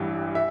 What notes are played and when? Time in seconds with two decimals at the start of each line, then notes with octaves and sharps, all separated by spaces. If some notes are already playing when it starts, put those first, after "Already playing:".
Already playing: A1 G2 E3 G3
0.35 E5